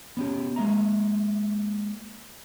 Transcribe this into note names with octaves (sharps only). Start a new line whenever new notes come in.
B3 C#4 G4
G#3 A#3 E5 A#5